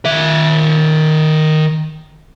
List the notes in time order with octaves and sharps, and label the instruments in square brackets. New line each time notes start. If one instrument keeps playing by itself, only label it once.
[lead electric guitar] D#3 E5